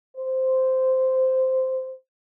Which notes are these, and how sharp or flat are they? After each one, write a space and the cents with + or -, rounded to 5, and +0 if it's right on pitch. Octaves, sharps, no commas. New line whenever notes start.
C5 -10